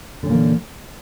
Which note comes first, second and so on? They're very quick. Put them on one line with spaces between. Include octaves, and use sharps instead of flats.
D3 C#4 A#2 A#3 E3